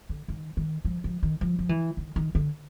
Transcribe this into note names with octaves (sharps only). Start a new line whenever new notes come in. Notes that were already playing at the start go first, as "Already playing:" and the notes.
D3
D#3
D#3
F3
F3
D#3
F3
F3
E3
D#3
D#3
D3